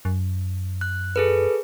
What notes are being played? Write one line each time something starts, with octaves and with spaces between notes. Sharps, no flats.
F#2
F#6
G#4 A4 B4